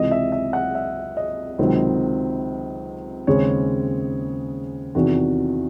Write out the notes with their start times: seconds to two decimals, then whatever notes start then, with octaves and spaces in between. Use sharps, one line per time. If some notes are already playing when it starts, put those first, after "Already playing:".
Already playing: C#2 C3 E3 D#5
0.11 E5
0.32 E5
0.53 F#5
0.75 E5
1.17 D#5
1.59 C#2 C3 D#3 F#3 C4
3.27 D#2 C#3 G#3 C4 C#5
4.95 E2 C3 D#3 F#4